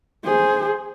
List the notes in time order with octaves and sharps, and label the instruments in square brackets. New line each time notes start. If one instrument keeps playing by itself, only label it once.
[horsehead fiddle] G#4 C5